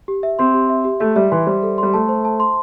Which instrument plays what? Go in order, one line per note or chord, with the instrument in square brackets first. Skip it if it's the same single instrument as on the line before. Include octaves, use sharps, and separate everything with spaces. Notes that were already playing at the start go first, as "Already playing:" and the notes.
[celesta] G4
E5
[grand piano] C4 [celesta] C6
[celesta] G4
E5
G4
[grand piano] A3 [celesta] E5
[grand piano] G3 [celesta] E5
[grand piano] E3 [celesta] C6
[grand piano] G3 [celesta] C5
[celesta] A4
[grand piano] G3 [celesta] C6
[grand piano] A3 [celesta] A5
[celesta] C5
A5
C6